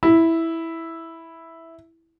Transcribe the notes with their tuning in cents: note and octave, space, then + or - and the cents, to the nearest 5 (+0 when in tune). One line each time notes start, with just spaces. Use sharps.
E4 -5